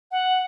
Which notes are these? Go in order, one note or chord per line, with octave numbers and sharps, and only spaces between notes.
F#5